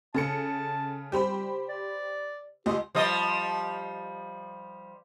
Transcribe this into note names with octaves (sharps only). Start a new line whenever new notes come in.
C#3 A4 A5 C#7
G3 G4 C5 B5
D5
C#2 G4 D#5 C6
F3 G3 D#5